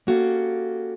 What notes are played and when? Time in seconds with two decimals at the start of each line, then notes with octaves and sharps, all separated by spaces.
0.07 A#3 C#4 F#4 G4 A4 F5